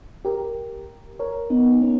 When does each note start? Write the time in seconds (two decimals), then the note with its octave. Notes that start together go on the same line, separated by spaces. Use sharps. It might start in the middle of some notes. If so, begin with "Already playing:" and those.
0.25 G4 A#4
1.19 A#4 C#5
1.50 B3 D#4
1.81 A#3 C#4